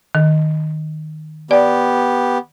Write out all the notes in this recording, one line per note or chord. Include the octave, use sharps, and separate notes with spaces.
D#3
B3 G4 D5